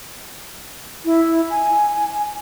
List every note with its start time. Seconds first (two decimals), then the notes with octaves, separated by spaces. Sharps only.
1.05 E4
1.50 G#5